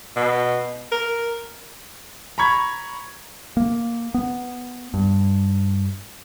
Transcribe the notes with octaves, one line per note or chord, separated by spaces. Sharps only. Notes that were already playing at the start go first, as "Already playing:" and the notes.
B2
A#4
A#5 B5 C#6 G#6
A#3
B3
G2